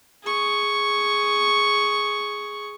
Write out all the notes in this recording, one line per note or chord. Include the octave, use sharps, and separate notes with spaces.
G#4 C#6